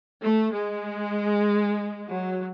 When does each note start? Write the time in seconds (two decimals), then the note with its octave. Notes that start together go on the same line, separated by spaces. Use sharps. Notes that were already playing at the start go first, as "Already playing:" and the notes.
0.21 A3
0.53 G#3
2.10 F#3